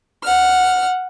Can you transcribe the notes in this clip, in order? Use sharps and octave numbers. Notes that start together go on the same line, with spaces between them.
F#5 F6